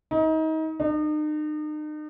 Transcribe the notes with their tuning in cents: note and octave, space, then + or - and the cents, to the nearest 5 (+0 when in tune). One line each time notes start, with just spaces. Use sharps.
D#4 +30
D#4 -40